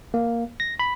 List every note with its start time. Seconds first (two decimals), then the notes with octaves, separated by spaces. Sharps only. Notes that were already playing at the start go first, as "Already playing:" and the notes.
0.14 A#3
0.60 A#6
0.79 B5